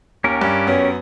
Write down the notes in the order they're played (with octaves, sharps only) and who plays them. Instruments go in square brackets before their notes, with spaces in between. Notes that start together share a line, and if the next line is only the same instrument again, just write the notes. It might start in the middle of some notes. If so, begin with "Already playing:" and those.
[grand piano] D#2 [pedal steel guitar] C#4 G4 A#4
[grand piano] G2
[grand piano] F#2 B3 [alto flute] C#5